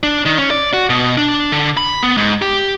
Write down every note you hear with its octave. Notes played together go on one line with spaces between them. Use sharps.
D4
D#3
C#4
D5
F#4
B2
D4
D3
B5
B3
G#2
G4